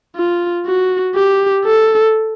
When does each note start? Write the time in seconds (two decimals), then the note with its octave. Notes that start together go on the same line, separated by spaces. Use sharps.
0.16 F4
0.66 F#4
1.15 G4
1.65 A4